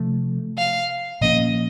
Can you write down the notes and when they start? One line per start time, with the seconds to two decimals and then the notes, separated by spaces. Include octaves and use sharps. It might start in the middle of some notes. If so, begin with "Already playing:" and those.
Already playing: C3 F3 A3
0.58 F5
1.21 A#2 F3 A#3 C#4 D#5